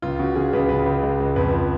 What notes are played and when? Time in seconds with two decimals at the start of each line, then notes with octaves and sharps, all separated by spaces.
0.02 C#2 F4
0.19 C#3 F#4
0.35 C#3 G#4
0.53 C#2 B4
0.69 C#2 B4
0.86 C#2
1.03 G#3
1.20 C#2
1.36 F2 B4
1.53 F3